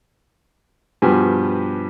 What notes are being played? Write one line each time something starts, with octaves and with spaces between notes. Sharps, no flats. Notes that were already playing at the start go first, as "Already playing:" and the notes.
G2 B2 F3 B3 G4 G#5